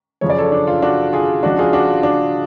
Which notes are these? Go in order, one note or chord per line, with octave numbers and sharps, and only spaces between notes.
F#2 C#3 F3 C#5
D5
A4 C#5
D4
F4
D4 F#4
F4 G#4
C#2 C#3 F3 D4 F#4
F4 G#4
D4 F#4
F4
D4